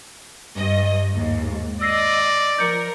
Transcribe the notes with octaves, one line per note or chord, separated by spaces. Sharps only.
G2 D#5
D#2 G#2
D5 D#5 E6 A#6 C7
F3 A#4 G6 C#7